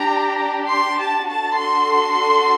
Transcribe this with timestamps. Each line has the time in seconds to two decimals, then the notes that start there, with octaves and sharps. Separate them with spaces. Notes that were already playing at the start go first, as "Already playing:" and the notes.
Already playing: D4 G4 A#5
0.70 C6
0.99 A5
1.28 D4 F#4 A4 A5
1.57 C6